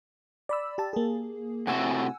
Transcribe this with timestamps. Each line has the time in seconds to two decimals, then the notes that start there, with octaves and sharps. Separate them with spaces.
0.49 D5 B5 E6
0.78 G4 A5
0.93 A#3 G#4
1.67 A2 C3 F#4 F#5 G#5 E6